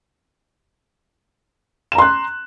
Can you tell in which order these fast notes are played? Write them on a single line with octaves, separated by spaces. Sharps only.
E7 A#5 C6 F#6